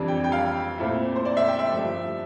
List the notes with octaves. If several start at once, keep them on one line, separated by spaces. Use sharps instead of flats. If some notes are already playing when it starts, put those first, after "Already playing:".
Already playing: F2 E3 G3 D4
G5
G5
F5
A#2 A3 C4 E4
C5
D5
E5
G5
E5
G2 F3 A3